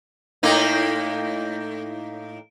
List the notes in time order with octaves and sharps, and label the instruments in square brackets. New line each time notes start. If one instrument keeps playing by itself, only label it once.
[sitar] A2 A#3 D#4